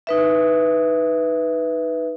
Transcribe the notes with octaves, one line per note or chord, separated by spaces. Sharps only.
D#4 B4 E5